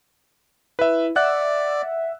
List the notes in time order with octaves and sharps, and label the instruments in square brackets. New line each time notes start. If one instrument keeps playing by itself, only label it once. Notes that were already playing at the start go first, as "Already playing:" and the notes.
[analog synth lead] E4 [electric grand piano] B4 E5
[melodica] D5 [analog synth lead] E5 [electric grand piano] F#5 F#6